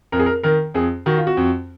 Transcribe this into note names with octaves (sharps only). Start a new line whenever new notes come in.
F2 A#4
G#4
A#4
D#3 A#4
F2 G#4
D#3 F#4
F4
F#4
F2